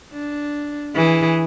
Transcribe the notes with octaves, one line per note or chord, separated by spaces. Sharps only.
D4
E3 G#4